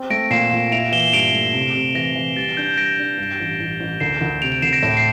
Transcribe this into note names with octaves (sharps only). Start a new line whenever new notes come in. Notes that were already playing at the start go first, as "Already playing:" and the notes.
Already playing: C4
A3 A#6 D7
A#2 C7 E7
A#2
E4 D7 F7
E3 E7 G7
G7
G2 D7 F7
A3
C3
C3
E3 A#6
E3
G3 A6
D4 G6
E7
G3 A#6 D7
D4
G2
A1
A1
A1
D2 C7 E7
D2
C3 D7 F7
D7 F7
D2 C7 E7
A#6 D7
A2
D7
C7